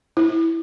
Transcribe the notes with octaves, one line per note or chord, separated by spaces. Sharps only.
E4